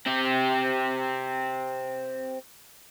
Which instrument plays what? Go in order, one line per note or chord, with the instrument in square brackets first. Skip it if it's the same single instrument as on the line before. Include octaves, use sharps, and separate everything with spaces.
[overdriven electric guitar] C4 G4